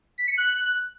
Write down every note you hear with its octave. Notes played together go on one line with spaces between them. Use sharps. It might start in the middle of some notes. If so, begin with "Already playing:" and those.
B6
C#7
F#6